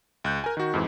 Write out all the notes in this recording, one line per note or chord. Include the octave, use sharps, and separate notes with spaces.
C#2 F#6 G6
A#4 G#5
D#3 F#4
F2 G#2 E3